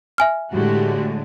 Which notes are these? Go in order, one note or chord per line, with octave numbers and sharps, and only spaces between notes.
E5 G#5 F6
A2 D3 G#3 F#4 G4